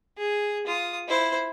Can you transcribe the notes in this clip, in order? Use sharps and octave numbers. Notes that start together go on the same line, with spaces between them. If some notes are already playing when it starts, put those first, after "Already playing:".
G#4
F4 D#6
E4 C5